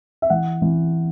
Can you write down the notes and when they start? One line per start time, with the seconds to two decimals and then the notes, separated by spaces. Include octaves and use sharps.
0.22 E5
0.30 E3 F#5
0.62 E3